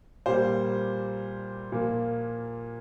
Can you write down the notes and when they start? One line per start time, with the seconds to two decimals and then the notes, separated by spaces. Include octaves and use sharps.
0.26 A#2 G3 A#3 C5
1.72 A#2 F3 A#3